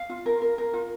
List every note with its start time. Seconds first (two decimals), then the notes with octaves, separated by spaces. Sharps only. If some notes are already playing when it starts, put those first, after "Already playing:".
Already playing: F5
0.10 F4
0.26 A#4
0.42 A#4
0.58 A#4
0.73 F4